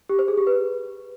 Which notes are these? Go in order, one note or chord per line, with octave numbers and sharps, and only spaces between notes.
G4
C5
G#4
G4
B4